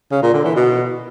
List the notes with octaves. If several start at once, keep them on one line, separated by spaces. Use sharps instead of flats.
C#3
A#2
D3
E3
B2